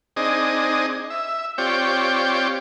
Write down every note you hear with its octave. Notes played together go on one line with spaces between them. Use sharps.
C4 D4 D#4 G#4 D#5
E5
C4 F4 G4 C#5 D5 G5